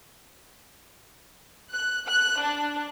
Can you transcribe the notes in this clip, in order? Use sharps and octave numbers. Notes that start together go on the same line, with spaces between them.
F#6
F#6
D4